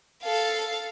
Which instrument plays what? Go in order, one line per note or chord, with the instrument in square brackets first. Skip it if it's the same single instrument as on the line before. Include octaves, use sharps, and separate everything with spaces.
[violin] A4 F5